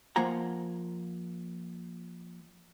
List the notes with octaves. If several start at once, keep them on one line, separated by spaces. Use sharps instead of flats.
F3 A#3 F4 F#5 G#5 A#5